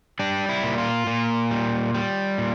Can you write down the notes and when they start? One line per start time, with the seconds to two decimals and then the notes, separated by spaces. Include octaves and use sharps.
0.19 G3 D4
0.49 E4
0.63 A#2
0.78 F4
1.07 A#2
1.51 G3
1.94 G3
2.38 A#2